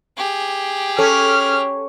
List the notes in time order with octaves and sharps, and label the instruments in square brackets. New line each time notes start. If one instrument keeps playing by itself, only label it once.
[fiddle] G4 G#4
[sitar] C#4 [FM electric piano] A4 [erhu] F6